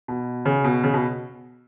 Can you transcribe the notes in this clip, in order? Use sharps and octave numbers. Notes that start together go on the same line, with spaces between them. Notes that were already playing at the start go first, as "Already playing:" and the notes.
B2
C#3
B2
C#3
B2